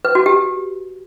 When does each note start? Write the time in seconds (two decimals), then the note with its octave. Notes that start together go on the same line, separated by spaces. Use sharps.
0.05 B4
0.15 F#4
0.26 G4